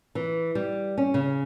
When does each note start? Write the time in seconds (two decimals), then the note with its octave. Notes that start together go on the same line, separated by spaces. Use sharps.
0.15 E3
0.55 G3
0.98 C#4
1.14 C#3